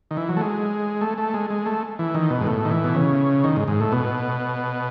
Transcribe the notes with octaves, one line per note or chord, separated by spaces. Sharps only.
D#3
E3
F#3
A3
G#3
A3
A3
G#3
G#3
A3
E3
D#3
B2
G#2
A2
D#3
E3
B2
C#3
D#3
G#2
G#2
A2
B2